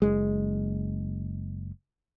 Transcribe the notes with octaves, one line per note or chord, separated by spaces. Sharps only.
F#1 G#3